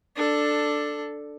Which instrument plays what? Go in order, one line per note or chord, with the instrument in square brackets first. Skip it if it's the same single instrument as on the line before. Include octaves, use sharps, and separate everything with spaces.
[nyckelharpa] D4 A4